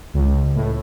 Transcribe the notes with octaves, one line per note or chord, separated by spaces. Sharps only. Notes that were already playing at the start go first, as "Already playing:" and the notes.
C#2
A2